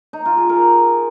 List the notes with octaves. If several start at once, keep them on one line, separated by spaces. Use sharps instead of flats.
D#4
F4
G#4
A#4